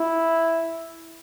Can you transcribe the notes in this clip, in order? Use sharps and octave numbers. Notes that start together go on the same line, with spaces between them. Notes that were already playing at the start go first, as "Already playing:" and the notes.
Already playing: E4